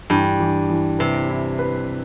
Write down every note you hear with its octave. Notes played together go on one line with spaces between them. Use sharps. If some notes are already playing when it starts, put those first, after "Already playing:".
G2 E3
E3
E3
C3 B4
E4
B4